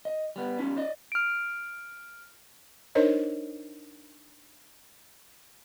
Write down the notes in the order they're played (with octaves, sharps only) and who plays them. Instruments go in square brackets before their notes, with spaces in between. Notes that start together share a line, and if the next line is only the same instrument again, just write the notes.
[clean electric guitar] D#5
G3 B3
G3 C#4 D#4 F4
D5 D#5
[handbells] F6 D7
[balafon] D4 D#4 A#4 C5 C#5 D#5